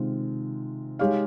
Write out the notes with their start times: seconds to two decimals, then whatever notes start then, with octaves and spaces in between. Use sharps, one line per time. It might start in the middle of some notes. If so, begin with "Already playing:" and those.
Already playing: C3 D#3 G#3 C4 F4
0.99 G#3 D#4 G4 C#5 F5